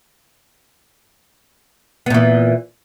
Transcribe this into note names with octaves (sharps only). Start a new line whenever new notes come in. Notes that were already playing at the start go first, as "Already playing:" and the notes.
A#2 E3 B3